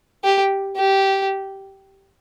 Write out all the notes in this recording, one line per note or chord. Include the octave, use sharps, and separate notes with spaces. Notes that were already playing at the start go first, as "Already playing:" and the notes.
G4
G4